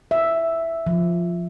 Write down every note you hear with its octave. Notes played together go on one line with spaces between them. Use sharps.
E5
F3